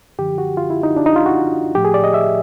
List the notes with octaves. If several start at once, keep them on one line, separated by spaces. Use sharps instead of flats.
F#2 D3 F3 G4
F#4
F4
E4
D#4
D4
D#4
F4
F#4
A2 F3 G4
G#4
D5
D#5
E5